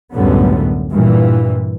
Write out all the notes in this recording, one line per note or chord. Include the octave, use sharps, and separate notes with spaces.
C#2 F#2 A2 D3 G3 B3
G2 A#2 E3